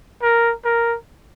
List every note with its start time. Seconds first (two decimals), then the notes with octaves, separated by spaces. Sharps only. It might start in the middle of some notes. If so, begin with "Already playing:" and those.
0.22 A#4
0.65 A#4